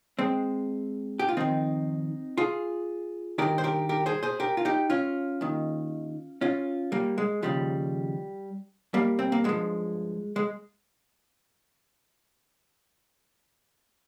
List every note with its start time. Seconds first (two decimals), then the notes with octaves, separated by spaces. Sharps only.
0.19 G#3 C4
1.19 G4
1.29 F4
1.37 F2 D#3 C4 D#4
2.38 F4 G#4
3.38 G2 D#3 G4 A#4
3.58 C5
3.64 G4 A#4
3.89 G4 A#4
4.06 G#4 C5
4.23 G#4 C5
4.40 G4 A#4
4.57 F4
4.65 D#4 G4
4.90 C#4 F4
5.41 D#2 D#3
6.41 C#4 F4
6.92 G3 A#3
7.18 G#3
7.43 D#2 C#3 F3 G3
8.94 G3 A#3
9.19 C4
9.32 A#3
9.44 G2 F3 G#3
10.36 G#3